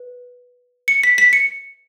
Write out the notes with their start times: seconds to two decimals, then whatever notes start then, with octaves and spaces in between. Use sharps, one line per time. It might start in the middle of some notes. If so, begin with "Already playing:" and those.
Already playing: B4
0.88 C#7
1.03 B6
1.18 B6
1.33 C#7